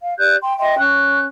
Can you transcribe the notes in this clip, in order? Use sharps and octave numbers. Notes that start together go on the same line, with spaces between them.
F5
G4 D5 F#6 G6
G5 C6
D#5 E5 G5 C6
C#4 F#6